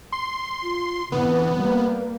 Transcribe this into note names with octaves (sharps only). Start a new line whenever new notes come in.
C6
F4
F2 D3 E3 B3 B4
G3 A#3